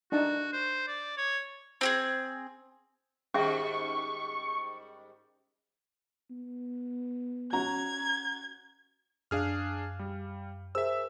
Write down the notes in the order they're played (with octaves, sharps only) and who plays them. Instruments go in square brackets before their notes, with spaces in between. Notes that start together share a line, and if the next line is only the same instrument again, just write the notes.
[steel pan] D4 D#4 A5 [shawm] F#4
[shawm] C5
D5
C#5
[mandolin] C4 G4 G#4
[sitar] G#2 D#3 G3 [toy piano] C#4 G#4 E5 [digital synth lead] C#6
[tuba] B3
[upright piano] C#4 F#4 A#5 [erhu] G#6
[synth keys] F#2 F5 [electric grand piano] D4 G#4 F6
[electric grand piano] G3
[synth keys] G#4 A#4 C5 [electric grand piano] E5 E6